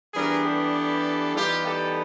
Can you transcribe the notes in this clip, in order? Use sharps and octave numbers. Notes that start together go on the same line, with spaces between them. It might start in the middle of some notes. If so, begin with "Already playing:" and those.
E3 G3 B3 D4 G#4 A#4
G4 A4
E3 G3 B3 D#4 F4 G4
G4 A4